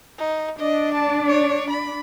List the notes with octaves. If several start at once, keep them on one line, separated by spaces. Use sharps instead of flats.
D#4
D4 D5 D#5
A5
C#5
B5